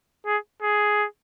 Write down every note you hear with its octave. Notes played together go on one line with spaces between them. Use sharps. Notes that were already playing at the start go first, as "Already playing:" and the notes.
G#4
G#4